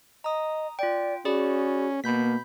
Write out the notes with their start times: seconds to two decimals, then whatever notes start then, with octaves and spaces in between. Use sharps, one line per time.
0.24 D#5 A#5 D#6
0.79 F4 D5 G5
1.25 C#4 F#4 G#4 D5 B5
2.04 B2 A#3 B5 G6 B6